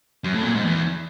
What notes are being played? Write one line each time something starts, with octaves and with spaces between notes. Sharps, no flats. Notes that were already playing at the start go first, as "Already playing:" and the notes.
F#2
A2
A#2
G#2
E2